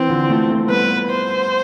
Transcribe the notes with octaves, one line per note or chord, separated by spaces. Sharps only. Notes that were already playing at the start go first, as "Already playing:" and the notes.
Already playing: E3 C4
D3 F3
F3 A3
A3 C4
G3 B3 B4
C5